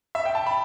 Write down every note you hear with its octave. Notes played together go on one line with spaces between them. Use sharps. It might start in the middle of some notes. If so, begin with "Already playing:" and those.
E5
G5
A5
B5